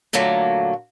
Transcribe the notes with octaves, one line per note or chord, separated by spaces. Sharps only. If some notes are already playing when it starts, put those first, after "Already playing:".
A#2 D3 F#3 A3 A#3